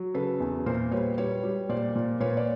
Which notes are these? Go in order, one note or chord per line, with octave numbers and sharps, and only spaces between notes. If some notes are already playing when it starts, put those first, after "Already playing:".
Already playing: F#3
C#3 A4 B4
E2
A#2 A#4 C5
G3 B4 C#5
G3 B4 C#5
G3
A#2 C5 D5
A#2
A#2 B4 C#5
D5